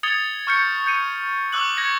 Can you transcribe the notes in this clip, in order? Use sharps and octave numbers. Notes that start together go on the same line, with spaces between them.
D#6 G#6 A6 C#7 F7 G7
C#6 F6 G6 C#7
G6 C#7 D#7
C#6 D6 E6 F#6 F#7
G#6 A#6 C#7